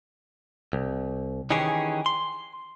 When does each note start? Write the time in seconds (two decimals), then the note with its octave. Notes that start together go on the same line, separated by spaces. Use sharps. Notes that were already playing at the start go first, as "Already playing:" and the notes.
0.73 C2
1.50 D#3 E3 C#4 G4 G#4
2.06 C6